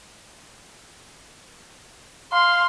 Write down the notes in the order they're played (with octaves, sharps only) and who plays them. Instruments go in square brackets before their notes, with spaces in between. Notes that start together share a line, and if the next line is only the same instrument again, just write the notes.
[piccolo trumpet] F5 [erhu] C6